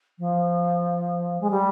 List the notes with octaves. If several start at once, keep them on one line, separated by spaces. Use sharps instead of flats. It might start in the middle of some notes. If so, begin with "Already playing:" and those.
F3
G#3
G3